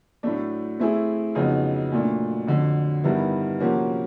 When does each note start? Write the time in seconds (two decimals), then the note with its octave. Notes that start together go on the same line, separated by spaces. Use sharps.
0.23 A2 F#3 A3 D4
0.80 A3 C4 E4 G#4
1.35 F2 C#3 F#3 B3 D#4
1.92 A#2 F#3 A3 D4
2.47 F2 D3 F#3
3.04 G2 D#3 G3 B3 E4
3.60 C3 F3 A#3 C#4 F#4